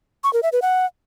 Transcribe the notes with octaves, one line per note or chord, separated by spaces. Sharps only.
C#6
A#4
E5
B4
F#5